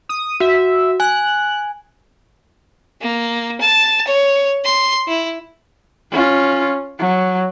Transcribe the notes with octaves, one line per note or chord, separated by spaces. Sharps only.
D#6
F#4 E5
G#5 F#6
A#3
A5
C#5
C6
E4
C#4 F4
F#3